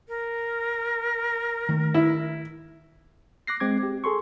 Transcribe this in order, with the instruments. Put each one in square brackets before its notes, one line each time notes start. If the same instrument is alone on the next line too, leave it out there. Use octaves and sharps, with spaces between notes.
[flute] A#4
[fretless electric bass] D#3 A3
[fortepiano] E4
[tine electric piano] D6 F#6 A#6 C7
G#3 C4 D6 G#6
G4
G#4 A4 C6 C#6